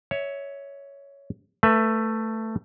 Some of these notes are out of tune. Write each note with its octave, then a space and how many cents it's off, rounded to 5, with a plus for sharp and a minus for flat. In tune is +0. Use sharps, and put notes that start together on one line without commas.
C#5 +10 E5 -15
A3 +10 B4 +0 E5 +15